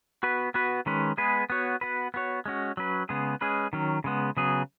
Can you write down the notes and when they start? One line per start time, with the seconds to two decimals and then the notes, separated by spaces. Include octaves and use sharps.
0.23 B3 F#4 B4
0.54 B3 F#4 B4
0.86 D#3 G#3 C#4 B4
1.17 G#3 B3 G#4 B4
1.50 B3 F#4 C#5
1.81 B3 F#4 B4
2.14 B3 F#4 C#5
2.46 G#3 C#4 F#4
2.77 F#3 C#4 B4
3.09 C#3 G#3 B3 G#4
3.41 G#3 C#4 G#4 B4
3.73 D#3 F#3 C#4
4.04 C#3 G#3 B3
4.37 C#3 F#3 B3 G#4